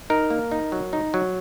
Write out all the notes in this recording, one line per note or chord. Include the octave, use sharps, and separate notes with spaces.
D#4 A#4
A#3
D#4
F#3
D#4
F#3